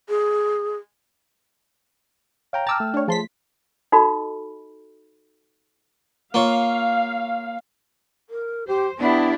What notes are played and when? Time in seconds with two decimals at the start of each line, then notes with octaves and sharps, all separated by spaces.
0.09 G#4
2.53 C#5 F5 G5 A#5
2.67 G5 A5 A#5 D6 E6 F6
2.80 A3
2.94 D4 C#5
3.08 F3 G#4 A5 C6 B6
3.92 D#4 F#4 A4 D#5 B5
6.34 A#3 F4 C#5 F5
8.30 A#4
8.68 G4 C5
8.99 B3 D4 E4 G4